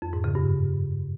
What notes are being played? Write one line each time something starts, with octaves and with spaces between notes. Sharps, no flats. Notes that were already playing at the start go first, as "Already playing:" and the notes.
F2
G#2
C#3
G2